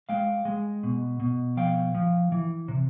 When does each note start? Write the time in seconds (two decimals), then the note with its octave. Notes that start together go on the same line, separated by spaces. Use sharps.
0.09 G#3 F5 G5
0.45 G#3
0.83 B2
1.20 B2
1.57 F3 F5 G5
1.95 F3
2.32 E3
2.68 C3